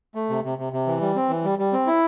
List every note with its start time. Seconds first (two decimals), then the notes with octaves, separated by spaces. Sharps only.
0.15 A3
0.30 C3
0.44 C3
0.58 C3
0.73 C3
0.87 E3
1.01 G3
1.16 C4
1.29 E3
1.44 G3
1.59 G3
1.73 C4
1.87 E4